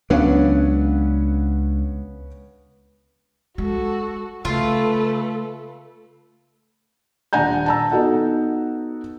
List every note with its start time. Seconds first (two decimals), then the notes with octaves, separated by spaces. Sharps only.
0.10 C#2 F#3 B3 C#4 D4 F5
3.58 G#3 F#4 A4
4.45 C#3 A3 F4 A4 B4
7.33 D#1 D4 F#5 G#5 A#5 G6
7.66 A5 A#5 E6
7.92 B3 D#4 F#4 A4 F#5